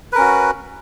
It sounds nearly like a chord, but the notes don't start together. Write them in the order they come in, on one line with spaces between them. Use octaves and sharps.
B4 A#4 C#4 F#4